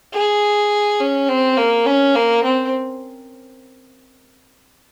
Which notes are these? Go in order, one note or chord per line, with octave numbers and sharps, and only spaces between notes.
G#4
C#4
C4
A#3
C#4
A#3
C4